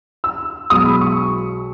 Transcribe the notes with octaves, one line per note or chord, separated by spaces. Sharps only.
E6
B1 B2 G#3 D#6
B5
C#6